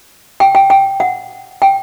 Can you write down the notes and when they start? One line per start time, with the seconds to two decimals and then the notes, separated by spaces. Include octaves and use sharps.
0.40 G5
0.55 G5
0.70 G5
1.00 F#5
1.62 G5